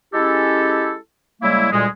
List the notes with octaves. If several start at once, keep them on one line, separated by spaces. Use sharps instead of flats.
G#3 C#4 E4 G4 A4
C#3 G3 G#3 A#3 E4
D2 A#2 G3 G#3